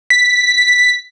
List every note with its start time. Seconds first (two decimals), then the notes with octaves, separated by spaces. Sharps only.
0.10 B6